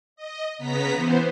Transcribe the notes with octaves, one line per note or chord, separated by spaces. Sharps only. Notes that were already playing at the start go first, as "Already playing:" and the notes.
D#5
C#3 B3 A#5 B6
E3 B3 C5